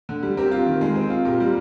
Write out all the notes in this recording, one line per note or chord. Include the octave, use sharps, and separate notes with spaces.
D3
G3
C4 G4 A#4
F4
D#3
G#3
C4
F4
A#2 G4 A#4
G3